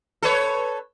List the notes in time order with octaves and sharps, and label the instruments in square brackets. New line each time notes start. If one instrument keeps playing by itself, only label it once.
[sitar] A4 B4 C#5